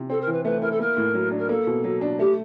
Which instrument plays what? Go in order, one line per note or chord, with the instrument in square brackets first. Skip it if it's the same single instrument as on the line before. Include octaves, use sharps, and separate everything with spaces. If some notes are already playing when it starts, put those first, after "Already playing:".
Already playing: [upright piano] C3
[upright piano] C4 [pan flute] A4
[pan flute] A#4
[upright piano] E3
[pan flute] B4
[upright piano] A3 [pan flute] B4
[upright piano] E4 [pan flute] A#4
[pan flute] A4
[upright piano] A#3 [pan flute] A#4
[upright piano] A2
F#3
D4
[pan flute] A#4
[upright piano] A#3 [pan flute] A4
[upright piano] B2
F#3
D4
[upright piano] A3 [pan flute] G4